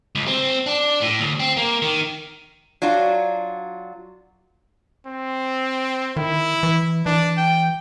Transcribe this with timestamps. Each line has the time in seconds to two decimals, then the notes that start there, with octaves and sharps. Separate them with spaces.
0.15 C#2
0.28 C4
0.67 D4
1.01 A2
1.20 D2
1.40 C4
1.57 A#3
1.82 D#3
2.82 F#3 D4 F4 F#4
5.07 C4
6.16 D#3 E4
6.63 E3
7.06 E3 D4
7.37 G5